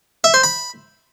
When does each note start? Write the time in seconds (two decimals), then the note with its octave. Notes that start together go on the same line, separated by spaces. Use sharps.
0.24 E5
0.34 C5
0.43 B5